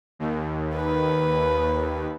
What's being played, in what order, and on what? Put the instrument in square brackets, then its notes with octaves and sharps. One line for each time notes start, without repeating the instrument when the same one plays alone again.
[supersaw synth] D#2
[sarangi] B4